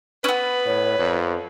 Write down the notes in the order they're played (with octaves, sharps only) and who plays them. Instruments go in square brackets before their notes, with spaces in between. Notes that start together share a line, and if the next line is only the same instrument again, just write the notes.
[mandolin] B3 C#4 [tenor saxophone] B4
[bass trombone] A2 [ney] C#5
[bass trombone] F2